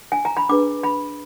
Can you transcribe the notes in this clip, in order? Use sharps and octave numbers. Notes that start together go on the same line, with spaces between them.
G#5
A#5
B5
D4 G#4 B4 D6
B5